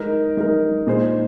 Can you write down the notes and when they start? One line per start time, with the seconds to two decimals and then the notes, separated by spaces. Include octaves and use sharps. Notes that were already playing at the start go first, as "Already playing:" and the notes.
Already playing: G#3 D#4 A#4
0.37 G#3 D#4 A#4
0.87 A#2 G#3 D#4 G#4 C5